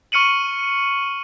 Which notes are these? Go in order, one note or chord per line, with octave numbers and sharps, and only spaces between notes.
C#6 F6 C#7 D#7 F#7